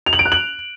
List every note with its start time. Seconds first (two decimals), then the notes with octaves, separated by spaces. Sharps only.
0.06 F7
0.13 F#7
0.19 D7
0.25 F#6
0.32 F#7